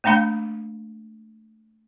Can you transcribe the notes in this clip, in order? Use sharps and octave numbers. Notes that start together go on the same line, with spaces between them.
A3 A#3 D4 F5 B5